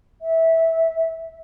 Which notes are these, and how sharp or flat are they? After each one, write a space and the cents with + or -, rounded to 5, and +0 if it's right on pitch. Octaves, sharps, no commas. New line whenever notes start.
E5 -15